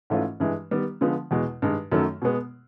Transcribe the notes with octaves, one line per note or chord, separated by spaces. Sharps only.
G#2 E3 A3 C#4 F4
G2 E3 G#3
D#3 G3 B3
D3 F3 G#3 B3
E2 B2 G#3
G2 D#3 G#3
F#2 D#3 F#3 A3
B2 G#3 B3